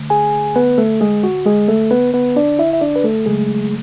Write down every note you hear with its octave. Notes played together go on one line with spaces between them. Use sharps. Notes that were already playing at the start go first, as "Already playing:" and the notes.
Already playing: D3 A3
G#4 G#5
B3 B4
A3 A4
G#3 G#4
F#4
G#3 G#4
A3 A4
B3 B4
B3 B4
D4 D5
E4 E5
E5
D4 D5
B4
A3 A4
C#3 F#3 G#3 A3 G#4